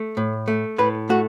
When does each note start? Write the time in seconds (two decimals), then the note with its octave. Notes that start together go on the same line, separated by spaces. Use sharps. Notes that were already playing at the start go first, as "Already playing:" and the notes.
Already playing: A3
0.17 A2
0.48 A3
0.79 A2 B4
1.09 A3 F#4